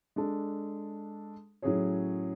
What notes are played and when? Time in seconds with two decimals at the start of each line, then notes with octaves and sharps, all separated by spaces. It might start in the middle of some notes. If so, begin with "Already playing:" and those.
0.16 G#3 D4 A4
1.62 A2 F#3 C#4 G#4 C#5